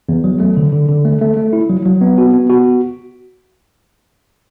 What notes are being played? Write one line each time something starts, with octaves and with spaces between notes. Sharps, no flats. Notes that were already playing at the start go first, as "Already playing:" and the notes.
E2
F#3
A3
D3
D3
D3
A3
A3
A3
E4
F#3
F#3
B3
F#4
B3
F#4